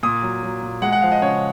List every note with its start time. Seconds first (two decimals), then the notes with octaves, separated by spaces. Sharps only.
0.03 A#2 D#6
0.22 F#3
0.43 F#3
0.63 A#2
0.82 G#3 F#5
0.92 F#5
1.02 F3 F5
1.12 D#5
1.22 C#3 C#5